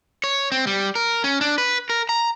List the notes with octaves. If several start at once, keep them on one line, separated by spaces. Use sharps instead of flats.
C#5
C4
G3
A#4
C#4
D4
B4
A#4
A#5